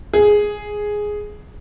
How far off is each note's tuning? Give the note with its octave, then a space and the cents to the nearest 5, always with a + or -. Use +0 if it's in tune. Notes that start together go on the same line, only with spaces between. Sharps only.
G#4 +0